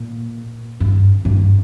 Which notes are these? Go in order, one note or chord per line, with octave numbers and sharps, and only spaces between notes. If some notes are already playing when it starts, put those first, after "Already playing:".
Already playing: A#2
G2
G2